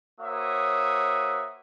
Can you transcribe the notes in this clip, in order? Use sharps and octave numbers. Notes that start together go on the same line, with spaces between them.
A#3 F#4 C5 C#5 E5 D#6